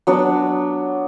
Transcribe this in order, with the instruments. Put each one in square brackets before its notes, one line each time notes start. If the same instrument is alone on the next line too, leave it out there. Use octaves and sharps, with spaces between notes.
[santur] F#3 B3 D4